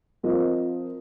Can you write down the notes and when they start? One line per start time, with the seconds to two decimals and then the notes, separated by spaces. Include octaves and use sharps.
0.23 F3 C4 F4 A#4 D#5